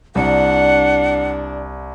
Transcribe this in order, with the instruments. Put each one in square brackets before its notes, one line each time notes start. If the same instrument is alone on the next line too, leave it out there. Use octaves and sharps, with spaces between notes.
[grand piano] C2 [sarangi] D4 [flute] F#5